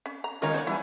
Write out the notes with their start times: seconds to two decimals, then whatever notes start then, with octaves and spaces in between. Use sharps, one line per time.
0.06 C#4
0.24 A#5
0.42 D#3 G#3 C#4 D#4 F4 A#4 C#5 A#5
0.54 B3 C5 D5
0.67 E3 G3 E4 G#5